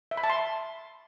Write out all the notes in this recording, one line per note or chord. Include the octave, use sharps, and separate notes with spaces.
E5
B5
A5
C6